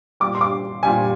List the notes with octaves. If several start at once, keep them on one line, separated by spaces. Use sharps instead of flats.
A#2 G3 D6
C6
D6
A#2 G3 G#5